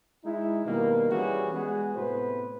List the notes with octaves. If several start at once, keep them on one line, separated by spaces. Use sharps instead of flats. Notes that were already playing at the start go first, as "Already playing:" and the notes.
G#3 D#4 E4
B2 D#3 G3 A#3
E3 G3 C#4 F#4 G#4
G#3 B3 F#4 G#4
A2 C3 B3 B4 C5